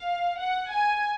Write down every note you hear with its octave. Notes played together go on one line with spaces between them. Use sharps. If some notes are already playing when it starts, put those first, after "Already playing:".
Already playing: F5
F#5
G#5